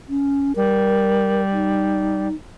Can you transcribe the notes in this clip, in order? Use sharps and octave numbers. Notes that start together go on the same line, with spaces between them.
C#4
G3 A#4
D#4